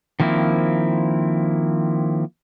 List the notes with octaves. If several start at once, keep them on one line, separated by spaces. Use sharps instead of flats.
D#3 F3 A#3 C4 E4